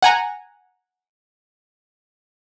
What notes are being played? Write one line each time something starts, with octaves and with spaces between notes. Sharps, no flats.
F#5 G#5 A#5